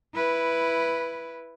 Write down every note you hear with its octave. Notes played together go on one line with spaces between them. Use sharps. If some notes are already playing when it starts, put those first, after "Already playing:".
E4 B4